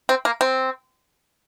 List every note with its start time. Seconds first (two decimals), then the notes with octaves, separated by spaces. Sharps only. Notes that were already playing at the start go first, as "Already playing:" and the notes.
0.09 C4
0.25 A#3
0.41 C4